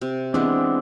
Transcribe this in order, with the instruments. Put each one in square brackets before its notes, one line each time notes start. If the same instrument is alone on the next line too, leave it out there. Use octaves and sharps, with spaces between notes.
[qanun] C3
[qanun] E3 G#3 B3 [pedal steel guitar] C4 D4